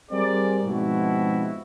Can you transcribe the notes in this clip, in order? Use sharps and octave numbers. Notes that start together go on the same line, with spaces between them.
G3 C4 G#4 A#4 D5
G#2 B2 F3 C4 E4 F#4